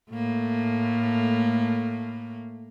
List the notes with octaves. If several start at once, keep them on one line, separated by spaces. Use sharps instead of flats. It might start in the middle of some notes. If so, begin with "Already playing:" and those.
A2 A3 A#3